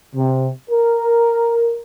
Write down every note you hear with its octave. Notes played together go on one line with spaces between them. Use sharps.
C3
A#4